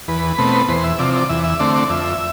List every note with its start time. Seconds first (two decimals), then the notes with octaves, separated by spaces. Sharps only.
0.08 E2 B4
0.38 B2 A3 C4
0.68 E2 C5
0.84 E5
0.99 C3 F3 D5
1.14 D5
1.29 E2 E5
1.44 E5
1.59 D3 A3 C4 D5
1.75 D5
1.89 F2 E5